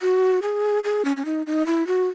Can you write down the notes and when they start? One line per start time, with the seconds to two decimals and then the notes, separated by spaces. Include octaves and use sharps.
0.02 F#4
0.42 G#4
0.84 G#4
1.05 C#4
1.17 C#4
1.25 D#4
1.47 D#4
1.67 E4
1.87 F#4